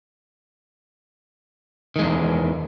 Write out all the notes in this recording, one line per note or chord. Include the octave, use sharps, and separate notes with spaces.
E2 D#3 G#3